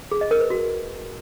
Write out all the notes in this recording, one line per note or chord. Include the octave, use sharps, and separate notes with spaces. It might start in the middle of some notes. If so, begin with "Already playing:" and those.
G#4
D#5
A#4
B4
F#4